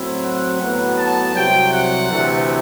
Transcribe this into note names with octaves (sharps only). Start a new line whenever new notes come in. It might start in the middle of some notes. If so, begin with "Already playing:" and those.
Already playing: A2 F#3 C4 E4
F#5
A2 F#3 B3
A5
C2 C3 F#3 G5
F#5
D2 C3 E3 A3